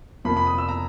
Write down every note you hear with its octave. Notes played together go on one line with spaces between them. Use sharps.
F2 C3 F3 A#3 B5
B5
D#6
E6
A#5